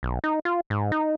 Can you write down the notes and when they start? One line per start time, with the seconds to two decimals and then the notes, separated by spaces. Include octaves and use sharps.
0.03 B1
0.24 D#4
0.45 F4
0.70 G#2
0.92 D#4